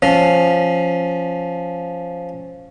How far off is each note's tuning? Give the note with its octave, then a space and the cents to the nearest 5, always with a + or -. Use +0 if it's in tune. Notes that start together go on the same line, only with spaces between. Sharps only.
F3 +0 C#4 +0